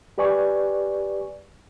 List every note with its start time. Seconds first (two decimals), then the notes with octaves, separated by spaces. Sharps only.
0.18 G4 B4 D5 G#5 C#6